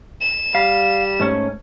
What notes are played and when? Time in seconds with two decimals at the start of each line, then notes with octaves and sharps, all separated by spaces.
0.21 E7
0.55 G3 F5
1.20 G#2 A3 C#4